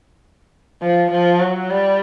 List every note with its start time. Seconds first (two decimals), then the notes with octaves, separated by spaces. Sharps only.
0.81 F3
1.11 F3
1.40 F#3
1.70 G3